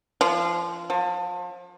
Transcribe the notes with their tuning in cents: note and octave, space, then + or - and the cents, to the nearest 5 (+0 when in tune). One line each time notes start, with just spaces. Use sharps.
F3 -25
F3 +35